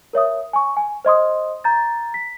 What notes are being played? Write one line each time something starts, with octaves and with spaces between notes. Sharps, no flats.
A#4 C#5 E5 D#6
G#5 C#6
G#5
C5 D#5 C6 D#6
A#5 G6 A6
B6